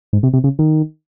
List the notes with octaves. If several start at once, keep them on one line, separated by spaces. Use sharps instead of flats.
G#2
C3
C3
C#3
D#3